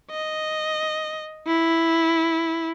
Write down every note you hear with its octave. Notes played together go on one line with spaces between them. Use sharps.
D#5
E4